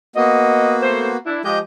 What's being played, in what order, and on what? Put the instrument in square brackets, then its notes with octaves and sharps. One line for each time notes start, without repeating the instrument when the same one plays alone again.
[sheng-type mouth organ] A#3 B3 F#4 [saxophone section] D#5
[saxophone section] A3 C5
D4 E4
[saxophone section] F3 G#3 [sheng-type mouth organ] G4 D#5 G6